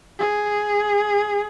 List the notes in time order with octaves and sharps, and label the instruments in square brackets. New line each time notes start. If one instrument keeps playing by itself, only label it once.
[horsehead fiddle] G#4